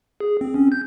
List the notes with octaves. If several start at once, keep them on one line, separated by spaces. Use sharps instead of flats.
G#4
C4
C#4
G6